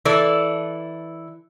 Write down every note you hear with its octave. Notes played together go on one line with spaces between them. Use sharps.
E3 A4 D5